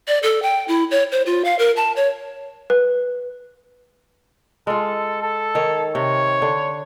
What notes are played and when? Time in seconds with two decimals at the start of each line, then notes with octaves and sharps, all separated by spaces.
0.08 D5
0.23 A4
0.42 G5
0.68 E4
0.91 C#5
1.12 C5
1.26 F4
1.45 F5
1.59 A#4
1.76 A5
1.96 C#5
2.70 B4
4.67 G#3 F4 A4
5.22 A4
5.55 D#3 C#5
5.95 C3 C#5
6.42 D3